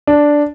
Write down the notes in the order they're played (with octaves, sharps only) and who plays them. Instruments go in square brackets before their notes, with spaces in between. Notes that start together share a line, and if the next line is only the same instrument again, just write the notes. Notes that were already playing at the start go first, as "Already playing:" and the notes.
[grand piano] D4